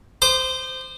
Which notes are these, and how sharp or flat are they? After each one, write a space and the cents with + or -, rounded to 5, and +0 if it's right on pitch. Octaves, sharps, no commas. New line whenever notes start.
C5 -15 D6 +45